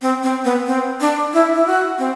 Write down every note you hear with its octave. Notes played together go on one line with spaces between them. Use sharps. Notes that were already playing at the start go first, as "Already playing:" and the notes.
C4
C4
B3
C4
D4
E4
E4
F#4
C4